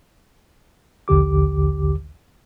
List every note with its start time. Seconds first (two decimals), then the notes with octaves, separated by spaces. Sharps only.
1.08 A#1 D#2 D3 G4 D6